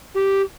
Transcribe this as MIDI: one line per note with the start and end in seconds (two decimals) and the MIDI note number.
0.15 0.42 67